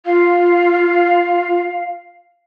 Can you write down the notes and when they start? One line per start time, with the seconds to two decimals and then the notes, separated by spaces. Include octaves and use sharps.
0.06 F4 F5